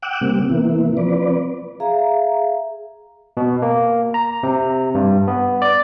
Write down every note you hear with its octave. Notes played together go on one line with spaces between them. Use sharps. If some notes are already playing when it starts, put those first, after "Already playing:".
F#5 G5 D6 E6 F#6
C3 G3 A#3 C4
C3 E3 A#3 B3 E4
F3 C4 B4 D5
G#4 E5 F5 A#5
B2
A#3
A#5
C3
G2
B3
D5